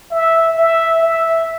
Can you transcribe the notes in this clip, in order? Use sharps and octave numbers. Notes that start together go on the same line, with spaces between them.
E5
E5
E5